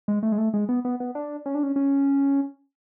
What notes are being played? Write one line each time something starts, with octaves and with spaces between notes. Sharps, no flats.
G#3
A3
G#3
A3
G#3
B3
B3
B3
D4
C#4
D4
C#4
C#4